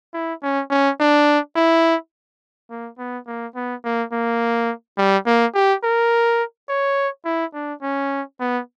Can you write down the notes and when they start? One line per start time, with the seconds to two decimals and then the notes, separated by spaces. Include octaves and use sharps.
0.14 E4
0.42 C#4
0.70 C#4
1.00 D4
1.56 E4
2.70 A#3
2.98 B3
3.27 A#3
3.55 B3
3.84 A#3
4.12 A#3
4.98 G3
5.26 A#3
5.55 G4
5.83 A#4
6.69 C#5
7.25 E4
7.54 D4
7.82 C#4
8.40 B3